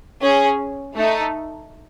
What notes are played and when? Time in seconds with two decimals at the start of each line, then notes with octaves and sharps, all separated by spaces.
0.21 C#4 G#4
0.95 A3 D#4 A4